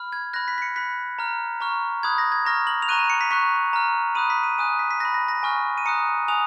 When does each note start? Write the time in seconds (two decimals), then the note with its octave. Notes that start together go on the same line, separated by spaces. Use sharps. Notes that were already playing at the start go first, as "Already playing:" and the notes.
Already playing: B5 F6
0.13 G#6
0.33 B5 F#6 A#6
0.48 B6
0.58 B6
0.62 C#7
0.76 B5 F#6 B6
1.19 A#5 F6
1.60 A#5 C#6 F6
2.03 B5 D#6 F#6 G#6
2.18 A#6
2.32 G#6
2.45 A#5 C#6 F6 A#6
2.67 F#7
2.82 F7
2.88 A#5 C#6 F#6 D#7
2.99 D#7
3.10 C#7
3.21 B6
3.31 A#5 C#6 F#6 B6
3.73 A#5 F6
4.15 B5 D#6 F#6 D#7
4.30 B6
4.44 D#7
4.58 G#5 D#6 F#6 D#7
4.79 B6
4.91 B6
5.00 B5 F#6 A#6
5.14 A#6
5.28 A#6
5.43 G#5 C#6 F6
5.78 D#7
5.85 A#5 D#6 F#6 C#7
6.28 G#5 D#6 F#6 F7